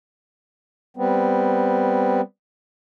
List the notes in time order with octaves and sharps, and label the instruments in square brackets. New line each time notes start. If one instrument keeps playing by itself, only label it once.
[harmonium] G3 B3 C4